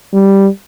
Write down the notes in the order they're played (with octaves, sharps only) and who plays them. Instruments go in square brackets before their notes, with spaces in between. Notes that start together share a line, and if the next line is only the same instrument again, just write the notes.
[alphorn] G3